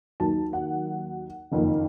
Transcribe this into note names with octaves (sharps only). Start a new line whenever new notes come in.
D#2 D#3 F#3 A#3 A5
F#5
F#1 F2 D#3 A#3